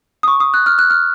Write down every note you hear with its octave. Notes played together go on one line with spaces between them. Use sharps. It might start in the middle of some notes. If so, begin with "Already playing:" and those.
D#6
C#6
D#6
F#6
F6
F#6
F6